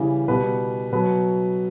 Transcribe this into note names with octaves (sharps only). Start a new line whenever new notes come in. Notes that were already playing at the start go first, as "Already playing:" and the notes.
Already playing: C#3 E3 G3
B2 G3 B4
B2 F#3 B4